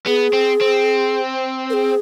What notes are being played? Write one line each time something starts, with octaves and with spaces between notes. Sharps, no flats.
B3 G#4
C4
C4
A#4
G#4